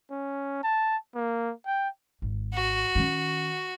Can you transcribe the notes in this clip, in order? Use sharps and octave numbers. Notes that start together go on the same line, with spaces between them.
C#4
A5
A#3
G5
G#1
F#4
D#3 C#4